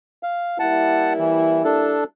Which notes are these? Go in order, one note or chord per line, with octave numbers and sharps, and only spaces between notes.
F5
G3 A#3 E4 F#5 A5
E3
D4 A4